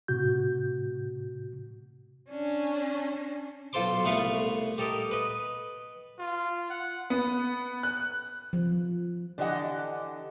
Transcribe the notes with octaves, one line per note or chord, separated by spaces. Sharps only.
A2 C3 F#4 G6
C#4 D4
B1 F4 A4 C5 C6 D6
C2 A3 B3 B4 F5 C#6
G4 A4 A#4 D#5
B4 D#5
F4
F#5
B3
F#6
F3
D3 E3 G4 D#5 F#5